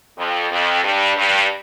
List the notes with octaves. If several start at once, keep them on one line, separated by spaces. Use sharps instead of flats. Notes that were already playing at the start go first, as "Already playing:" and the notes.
F2
F2
G2
G2